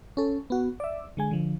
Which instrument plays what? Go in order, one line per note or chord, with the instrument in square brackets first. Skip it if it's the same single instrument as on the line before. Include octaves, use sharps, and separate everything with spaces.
[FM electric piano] C#4 A4
B3 F#4
D5 E5
D3 G#3 G#5
D3 F3